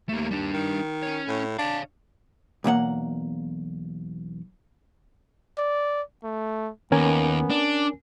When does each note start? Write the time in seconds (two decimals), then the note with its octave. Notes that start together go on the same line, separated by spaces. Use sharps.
0.09 D#2 A3 A#3
0.31 G3 D4
0.54 D#3
1.03 C#4 C#5
1.28 A2
1.59 D4 C#5 F5
2.64 B1 E2 A#3 F#5
5.58 D5
6.24 A3
6.92 D#2 B3 C#4 A#4 G#5
7.50 D4